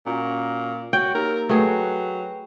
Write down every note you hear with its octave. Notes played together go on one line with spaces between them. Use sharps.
A#2 C#4 F#4 A#5
F#4 C#5 G5
A#3 D#4 G4 A#4
F#3 A3 G#4 B4 G5 C7